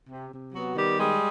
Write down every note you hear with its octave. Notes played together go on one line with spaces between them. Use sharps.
C3
C3
F#3 B3 F#4
D#3 G3 G4
G3 G#3 G#4